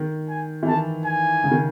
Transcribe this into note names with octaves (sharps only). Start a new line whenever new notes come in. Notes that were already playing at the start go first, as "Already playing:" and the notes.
Already playing: D#3
G#5
E3
D#3 A5
G#5
C#3
D#3